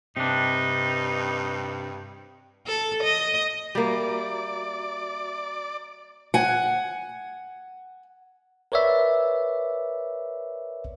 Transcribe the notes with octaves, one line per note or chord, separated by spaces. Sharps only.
G2 C3 D4 D#4
A4
D#5
G3 A#3 F#4 D5 E5 A#5
F#5 G#5
A#4 B4 C#5 D5 E5